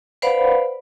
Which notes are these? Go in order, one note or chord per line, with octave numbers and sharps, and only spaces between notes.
B4 C5 D5 F5 F#5 B5